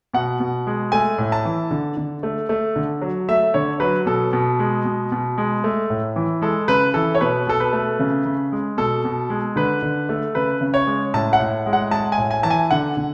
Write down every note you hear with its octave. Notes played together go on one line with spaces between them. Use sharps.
B2 F#5
B2
G#3
A3 G#5
A2
A5
E3
D3
D3
A3
A3
D3
F#3
A3 E5
D3 C#5
F#3 B4
B2 A4
B2
G#3
B2
B2
G#3
A3
A2
E3
G#3 A4
C#3 B4
E3 A4
C#5
B2 B4
B2 A4
B4
A3
C#3
C#3
G#3
B2 A4
B2
G#3
D3 B4
D3
A3
C#3 B4
C#3
C#5
G#3
A2 A5
F#5
A2
G#3
F#5
G#3 A5
G#5
A2
G#5
E3 A5
G#5
D3 F#5
D3